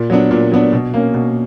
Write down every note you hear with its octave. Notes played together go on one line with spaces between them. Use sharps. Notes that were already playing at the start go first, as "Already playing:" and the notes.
Already playing: A#2
F#3 B3 D4
A#2
F#3 B3 D4
B2
A#3 C#4
B2